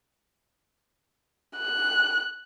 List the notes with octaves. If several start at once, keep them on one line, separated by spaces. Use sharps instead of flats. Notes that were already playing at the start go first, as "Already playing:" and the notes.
F#6